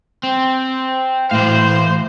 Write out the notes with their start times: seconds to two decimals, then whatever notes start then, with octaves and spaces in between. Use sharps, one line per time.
0.23 C4
1.31 A2 E3 C5 F5